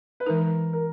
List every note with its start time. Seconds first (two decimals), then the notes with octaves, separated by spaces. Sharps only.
0.20 B4
0.26 E3 G#3 D#4 A#4
0.73 A#4